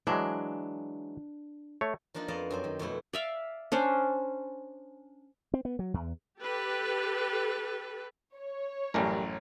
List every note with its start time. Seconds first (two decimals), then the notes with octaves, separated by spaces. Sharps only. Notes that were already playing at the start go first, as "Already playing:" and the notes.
0.07 E3 F#3 G#3 D4
1.81 A3 C#5
2.14 F3 A#3 D4 D#4 F4
2.28 F2 B3 D5 D#5 F5 A5
2.50 F#2 C4 C5
2.64 D#3
2.79 F2 B2 A3 E4
3.13 D5 E5 F5
3.72 C#4 D4 C5 D5
5.54 C4
5.65 B3
5.79 F#3
5.94 E2
6.40 G4 A4 B4
8.36 C#5
8.94 A1 F#2 G3 A#4